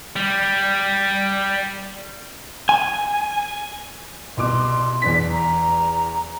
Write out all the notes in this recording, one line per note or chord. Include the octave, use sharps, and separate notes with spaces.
G3
G#5
C2 B2 C6 D6
E2 D4 B6
A#5